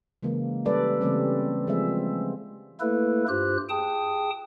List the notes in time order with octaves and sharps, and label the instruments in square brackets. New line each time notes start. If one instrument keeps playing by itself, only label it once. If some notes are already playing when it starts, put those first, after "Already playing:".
[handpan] C#3 E3 G#3 A#3
G3 C#4 A4 B4 D5
C#3 E3 G3 A3 C4 C#4
F3 G#3 C4 G#4 E5
[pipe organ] A3 A#3 E4 A4 B4
G2 F4 G4 C5 F#6
G#4 G5 A5 D#6